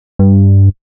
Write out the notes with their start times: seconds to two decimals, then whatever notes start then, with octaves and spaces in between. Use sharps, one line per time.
0.19 G2